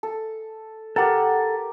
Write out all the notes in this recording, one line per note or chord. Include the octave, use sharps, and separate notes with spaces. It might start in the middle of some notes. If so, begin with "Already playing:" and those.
A4
G4 A4 A#4 F#5